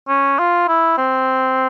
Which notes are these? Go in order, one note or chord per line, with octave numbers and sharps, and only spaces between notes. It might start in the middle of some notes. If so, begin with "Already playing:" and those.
C#4
F4
E4
C4